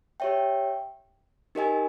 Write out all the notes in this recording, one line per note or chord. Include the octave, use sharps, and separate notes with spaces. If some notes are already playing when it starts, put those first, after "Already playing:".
G4 C#5 E5 G5
D#4 G4 A#4 D#5 G#5